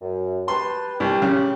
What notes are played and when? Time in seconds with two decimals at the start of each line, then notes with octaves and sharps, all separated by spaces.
0.02 F#2
0.48 G4 B4 A5 C6
1.00 C2 G4
1.22 C#3